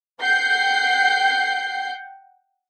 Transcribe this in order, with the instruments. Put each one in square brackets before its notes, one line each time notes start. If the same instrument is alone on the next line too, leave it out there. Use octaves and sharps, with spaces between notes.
[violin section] F#5 G5 G6 C7